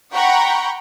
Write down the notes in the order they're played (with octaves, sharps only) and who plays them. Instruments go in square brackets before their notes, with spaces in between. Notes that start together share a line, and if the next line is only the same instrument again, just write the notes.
[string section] F#5 G5 A#5 B5 C#6